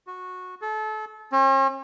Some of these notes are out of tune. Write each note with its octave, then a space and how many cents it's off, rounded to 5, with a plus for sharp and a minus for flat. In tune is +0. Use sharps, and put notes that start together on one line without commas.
F#4 -15
A4 -30
C#4 -45